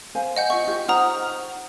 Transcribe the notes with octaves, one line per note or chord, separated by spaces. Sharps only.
C5 F5 G#5
D#5 F#5 G6
F4 D#5 E5 C#6
F4 G4
D#4 C5 F#5 A#5 D#6 F6